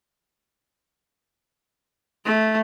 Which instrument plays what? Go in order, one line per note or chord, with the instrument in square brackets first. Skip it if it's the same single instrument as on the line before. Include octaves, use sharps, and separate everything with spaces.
[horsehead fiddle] A3